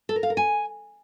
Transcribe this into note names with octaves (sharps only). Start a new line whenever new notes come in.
A4
A#4
F5
A#4
G#5